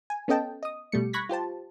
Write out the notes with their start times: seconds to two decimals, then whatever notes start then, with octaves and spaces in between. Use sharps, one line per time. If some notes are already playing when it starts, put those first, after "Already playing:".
0.10 G#5
0.28 B3 C#4 A4 D#5 G5 A5
0.63 D#5 D#6
0.92 B2 G3 A3 C#7
1.13 B5 C#6 F#6 G#6 A#6 B6
1.29 F4 G4 C5 A5